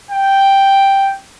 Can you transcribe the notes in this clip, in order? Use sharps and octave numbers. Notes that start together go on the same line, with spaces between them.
G5